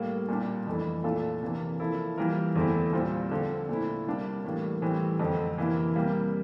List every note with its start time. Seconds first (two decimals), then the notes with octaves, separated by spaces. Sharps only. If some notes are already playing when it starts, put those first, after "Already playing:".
Already playing: A2 G3 A#3
0.29 A#2 G3 D4
0.66 F2 E3 A3 E4
1.04 A#2 A3 D4 F4 A4
1.42 C3 E3 A#3
1.79 F3 A#3 E4 A4
2.18 E3 G3 A#3 F4 A#4
2.56 E2 D3 A3 C4 E4
2.93 A#2 G3 C4 F4
3.31 D3 F3 C4
3.69 A#2 A3 E4
4.07 C3 G3 A#3 D4
4.45 A2 E3 G3 A#3
4.82 A2 E3 G3 C4
5.20 F2 D3 A3 C4
5.58 C3 E3 A#3 E4
5.95 C3 G3 A#3